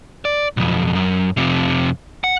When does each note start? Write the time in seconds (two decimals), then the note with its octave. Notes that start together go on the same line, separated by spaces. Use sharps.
0.25 D5
0.57 B1 F2
0.95 F#2
1.37 F2 C3
2.24 F#5